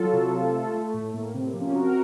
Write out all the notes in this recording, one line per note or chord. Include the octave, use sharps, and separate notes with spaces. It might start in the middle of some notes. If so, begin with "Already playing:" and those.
Already playing: F#3 F4 A4
C3
A3
A3
A3
A2
A2 A#3
C3 C4
A#3
F3
A#3 C#4
C3 F#4 A#4